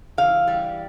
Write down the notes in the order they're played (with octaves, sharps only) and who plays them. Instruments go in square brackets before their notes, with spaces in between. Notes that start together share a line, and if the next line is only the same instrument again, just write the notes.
[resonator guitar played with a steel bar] E3 F5
G3